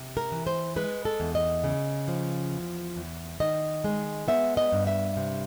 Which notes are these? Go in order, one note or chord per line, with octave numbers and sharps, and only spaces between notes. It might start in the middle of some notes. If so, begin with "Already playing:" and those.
Already playing: C3
A#4
E3
C5
G#3 B4
A4
E2
D#5
C#3
F3
E2
E2
D#3 D#5
G#3
B3 E5
D#5
G2
E5
C3